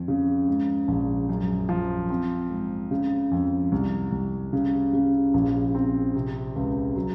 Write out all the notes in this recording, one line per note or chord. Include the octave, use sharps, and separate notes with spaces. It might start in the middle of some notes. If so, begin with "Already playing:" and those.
Already playing: F2
C#3
G#2
A#1
F#2
F3
C4
G#2
C#3
F2
C2
C2
C#3
C#3
A#1
C4
C3
C#2
F#3